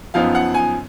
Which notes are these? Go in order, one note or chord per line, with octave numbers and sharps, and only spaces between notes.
F#2 F3 B3 D#4 F5
F#5
G#5